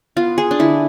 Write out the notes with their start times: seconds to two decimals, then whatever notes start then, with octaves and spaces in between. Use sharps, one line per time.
0.16 B3 F4
0.38 G#4
0.51 D4
0.59 D3 E4